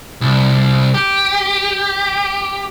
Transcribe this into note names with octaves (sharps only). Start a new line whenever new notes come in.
C2
G4